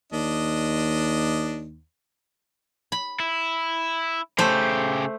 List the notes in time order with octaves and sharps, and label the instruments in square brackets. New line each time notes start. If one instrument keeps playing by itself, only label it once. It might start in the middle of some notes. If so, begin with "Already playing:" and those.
[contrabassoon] D#2 [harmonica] D4 D#5
[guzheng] B5
[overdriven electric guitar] E4
[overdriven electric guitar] C#3 G4 [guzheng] A3 C5